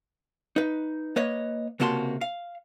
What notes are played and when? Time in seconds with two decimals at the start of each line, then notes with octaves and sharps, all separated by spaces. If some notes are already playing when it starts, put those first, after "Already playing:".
0.56 D#4 B4
1.16 A#3 B4 C#5 D#5
1.80 C#2 C3 A#3 F#4 A5 C6
2.21 F5